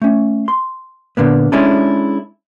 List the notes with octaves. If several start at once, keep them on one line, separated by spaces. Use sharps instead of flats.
A3 C#4
C6
A#2 D3 A#3 B3
G#3 C#4 D4 E4 G#4 A4